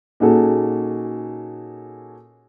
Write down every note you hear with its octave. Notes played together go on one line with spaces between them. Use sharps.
A#2 C#4 D#4 F#4 G#4 A4